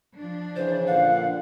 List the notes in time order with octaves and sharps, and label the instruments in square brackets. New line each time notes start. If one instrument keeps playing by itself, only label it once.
[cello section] F3 D4
[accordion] C#3 E3 [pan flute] C5
[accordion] A#2 D3 F#5 [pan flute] F5